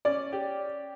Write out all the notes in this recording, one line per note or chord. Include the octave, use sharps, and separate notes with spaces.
C#4 D5
G4